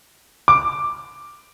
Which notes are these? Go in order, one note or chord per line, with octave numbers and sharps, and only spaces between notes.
D6